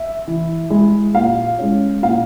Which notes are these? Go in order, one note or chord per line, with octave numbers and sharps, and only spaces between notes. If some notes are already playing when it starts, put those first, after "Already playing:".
Already playing: E5
E3
G#3 E4
A#2 F5
G#3 C#4
A#2 F5